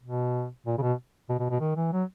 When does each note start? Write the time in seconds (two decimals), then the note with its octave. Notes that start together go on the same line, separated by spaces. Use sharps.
0.03 B2
0.66 A#2
0.78 C#3
0.82 B2
1.29 B2
1.39 B2
1.50 B2
1.60 D#3
1.76 E3
1.92 F#3